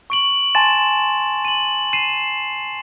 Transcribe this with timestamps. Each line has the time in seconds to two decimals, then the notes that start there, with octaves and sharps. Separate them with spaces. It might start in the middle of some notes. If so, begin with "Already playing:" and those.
0.10 C#6 D7 F#7
0.55 G#5 A5 C6 A6 E7
1.45 D#7 F#7
1.93 C7 D#7 E7